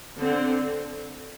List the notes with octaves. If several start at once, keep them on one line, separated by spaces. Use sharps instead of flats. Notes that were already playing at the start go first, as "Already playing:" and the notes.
D3 C4